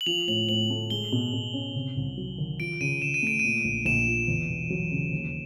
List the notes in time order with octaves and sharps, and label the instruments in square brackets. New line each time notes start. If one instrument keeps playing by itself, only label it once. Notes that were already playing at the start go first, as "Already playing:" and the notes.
[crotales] F#7
[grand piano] F3 [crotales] F7
[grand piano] A2 [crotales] F#7
[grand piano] A2 [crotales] F#7
[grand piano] A3
[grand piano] G#3 [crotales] G7
[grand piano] B2
B2
C#4
C3
C2
F#3
D#3
[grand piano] F3 [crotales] D7
[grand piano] C#3 [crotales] D#7
[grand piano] C#3 [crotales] E7
[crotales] D#7
[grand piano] A3 [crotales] D7
[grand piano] A#2 [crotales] D#7
[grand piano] A#1
[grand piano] A#1 [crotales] E7
[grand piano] F3
E2
E1
F#3
C#3
D#2